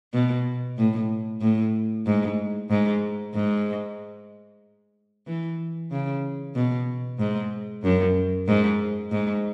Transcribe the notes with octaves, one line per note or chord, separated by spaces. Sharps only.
B2
A2
A2
G#2
G#2
G#2
E3
C#3
B2
G#2
F#2
G#2
G#2